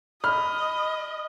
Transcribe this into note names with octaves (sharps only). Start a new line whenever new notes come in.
D#5 B5 F6